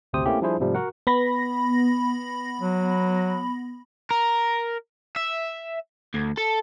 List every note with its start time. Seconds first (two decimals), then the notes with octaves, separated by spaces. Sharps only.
0.13 G#1 D2 C3 G4 C5 D#6
0.26 A3 A#3 C4 C#4 E4 G4
0.42 F3 G3 D4 E4 G#4 C5
0.60 G#2 C3 F3 G3 A3
0.75 F#4 A#4 F#5
1.07 B3 B5 A#6
2.61 F#3
4.11 A#4
5.16 E5
6.14 D2
6.38 A4